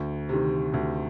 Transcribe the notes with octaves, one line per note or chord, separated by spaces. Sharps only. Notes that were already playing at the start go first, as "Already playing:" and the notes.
Already playing: D2
C3 D#3
D2